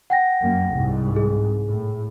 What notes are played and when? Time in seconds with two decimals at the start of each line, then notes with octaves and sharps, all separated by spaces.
0.10 F#5 G5 A#6
0.41 F#2 A#3
0.72 C2 G#2
1.16 G#4
1.67 A2